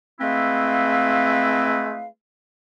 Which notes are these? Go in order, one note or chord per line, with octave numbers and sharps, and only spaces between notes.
G#3 A3 C4 E4 B4 F5